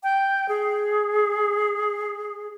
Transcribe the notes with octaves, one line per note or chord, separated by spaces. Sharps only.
G5
G#4